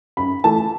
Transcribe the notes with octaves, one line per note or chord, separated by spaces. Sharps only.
F#2 B5
E3 A3 A5